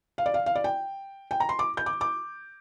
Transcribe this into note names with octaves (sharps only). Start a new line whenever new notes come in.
F5
D5
F5
F5
D5
G5
G5
A#5
C6
D6
G6
D6
D6